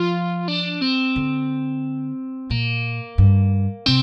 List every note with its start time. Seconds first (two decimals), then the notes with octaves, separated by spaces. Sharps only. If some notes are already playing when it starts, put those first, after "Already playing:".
Already playing: F3 F4
0.48 D4
0.82 C4
1.16 D3
2.50 A#2 A#3
3.18 G2
3.86 C3 C4